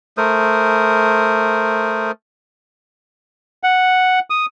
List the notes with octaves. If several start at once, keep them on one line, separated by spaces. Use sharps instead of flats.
A3 A#4 C5 D#6
F#5
D#6